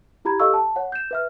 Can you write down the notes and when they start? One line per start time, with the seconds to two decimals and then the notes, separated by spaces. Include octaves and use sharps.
0.25 E4 G4 A#5 B5 G#6
0.40 G4 A4 D#5 F5 C#6 E6
0.54 A5
0.76 C#5 F#5
0.92 G6 E7
1.11 B4 E5 F6